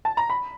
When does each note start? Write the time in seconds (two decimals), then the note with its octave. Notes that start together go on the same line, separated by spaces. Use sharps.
0.05 A5
0.17 A#5
0.30 B5